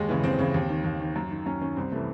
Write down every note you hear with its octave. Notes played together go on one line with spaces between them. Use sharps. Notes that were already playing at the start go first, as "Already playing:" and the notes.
Already playing: D#2 G#3
C#3 E3
D#2 C4
C#3 E3
D#2
D#3
D#2
D#3
F#2
D#3
F#2 C#4
D#3 C#4
C2 C4
C3 E3 A3